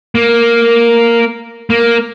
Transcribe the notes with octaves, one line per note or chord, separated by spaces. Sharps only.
A#3
A#3